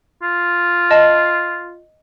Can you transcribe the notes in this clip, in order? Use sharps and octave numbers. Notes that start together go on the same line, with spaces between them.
F4
D#5 A5